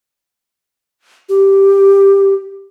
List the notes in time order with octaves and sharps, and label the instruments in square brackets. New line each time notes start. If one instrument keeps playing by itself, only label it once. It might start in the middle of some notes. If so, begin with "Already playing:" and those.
[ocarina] G4